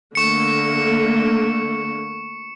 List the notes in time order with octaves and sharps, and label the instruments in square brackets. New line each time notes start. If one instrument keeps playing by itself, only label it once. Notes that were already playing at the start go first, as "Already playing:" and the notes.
[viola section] D3 A3 A#3 [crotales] C#6 C#7